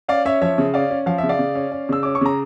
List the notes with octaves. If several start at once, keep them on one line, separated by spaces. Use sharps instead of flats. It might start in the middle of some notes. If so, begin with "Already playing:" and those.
C#4 D5 F5
C#4 C#5 E5
F3 C#5 E5
C#3
C#4 D5 F5
C#4
F3 F5
C#3 E5
D5 F5
C#3
C#4
C#4
C#3 E6
C#4 D6
C#6
C#3 A#5